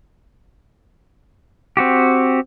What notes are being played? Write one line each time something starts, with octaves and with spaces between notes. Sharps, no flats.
C4 F#4 G4